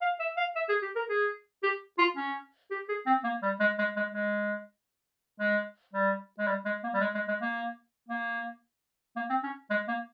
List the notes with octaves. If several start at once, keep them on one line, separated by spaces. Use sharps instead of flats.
F5
E5
F5
E5
G#4
G4
A#4
G#4
G4
F4
C#4
G4
G#4
C4
A#3
G3
G#3
G#3
G#3
G#3
G#3
G3
G#3
G3
G#3
A#3
G3
G#3
G#3
G#3
A#3
A#3
A#3
C4
C#4
G#3
A#3